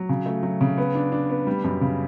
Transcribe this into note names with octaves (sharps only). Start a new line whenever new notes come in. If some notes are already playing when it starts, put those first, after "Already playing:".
Already playing: F#3
C#3
A3
F#3
C#3
B3
D4
D4
B3
G3
F#2
C#3